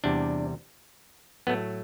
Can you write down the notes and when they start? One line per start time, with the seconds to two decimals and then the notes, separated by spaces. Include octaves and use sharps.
0.04 E2 C3 G3 D4
1.47 A2 F#3 A3 B3